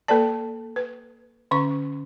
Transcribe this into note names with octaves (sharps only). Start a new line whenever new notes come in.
A#3 A4 B4 D5 A5
B4
D3 C#4 C#6